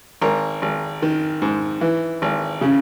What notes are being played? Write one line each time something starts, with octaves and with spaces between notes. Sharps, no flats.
G#1 A#4
G#1
D#3
G#2
E3
G#1
C#3